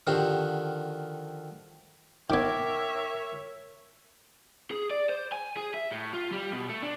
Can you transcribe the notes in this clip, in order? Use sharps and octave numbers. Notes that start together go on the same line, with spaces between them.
D3 D#3 F3 F#4 G4 C5
D#3 B3 A#4 C#5 E5 G5 D6 G#6
G#4
D5
C5
G#5
G#4
E5
A2
F4
G3
B2
A3
D4